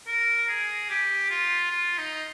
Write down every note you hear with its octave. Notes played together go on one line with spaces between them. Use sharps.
A#4
G#4
G4
F4
F4
D#4